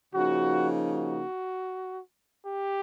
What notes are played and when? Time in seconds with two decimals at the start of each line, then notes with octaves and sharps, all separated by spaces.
0.15 C#3 F3 A#3 D#4 F#4
0.92 F#4
2.46 G4